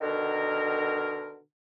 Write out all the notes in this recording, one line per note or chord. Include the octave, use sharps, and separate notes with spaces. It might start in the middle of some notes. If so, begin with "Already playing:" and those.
B2 D3 D#3 A#4